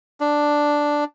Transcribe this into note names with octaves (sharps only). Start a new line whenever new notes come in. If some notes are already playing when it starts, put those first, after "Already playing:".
D4